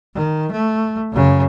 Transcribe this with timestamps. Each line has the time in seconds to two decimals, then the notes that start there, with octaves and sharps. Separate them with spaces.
0.15 D#3
0.51 A3
1.11 F#2 C#3